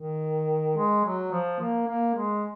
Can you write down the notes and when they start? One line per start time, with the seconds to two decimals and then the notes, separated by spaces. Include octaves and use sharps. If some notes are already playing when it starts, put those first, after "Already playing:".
Already playing: D#3
0.77 G#3
1.04 F#3
1.32 F3
1.60 A#3
1.87 A#3
2.15 G#3